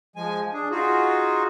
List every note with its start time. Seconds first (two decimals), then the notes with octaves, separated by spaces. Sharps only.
0.16 F3 G#3 G#5
0.53 D4 G#4
0.71 D#4 F4 F#4 G#4